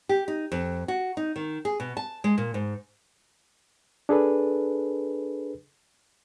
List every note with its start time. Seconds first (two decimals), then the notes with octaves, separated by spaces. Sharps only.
0.09 G4
0.28 D#4
0.52 F2
0.88 F#4
1.17 D#4
1.36 D#3
1.65 G#4
1.80 B2
1.97 A5
2.24 G#3
2.38 A#2
2.54 G#2
4.09 D4 G#4 A4 B4